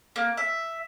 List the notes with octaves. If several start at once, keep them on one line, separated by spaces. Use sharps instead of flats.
A#3
E5